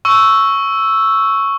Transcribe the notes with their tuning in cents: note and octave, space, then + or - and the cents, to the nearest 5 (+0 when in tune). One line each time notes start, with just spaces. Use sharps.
C#6 +0 E6 +0